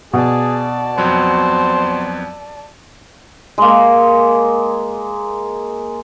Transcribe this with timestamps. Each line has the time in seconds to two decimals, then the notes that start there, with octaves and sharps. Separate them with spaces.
0.13 B2 G#4 D5 A5
0.98 F2 F#3 B3 C5
3.58 G#3 A#3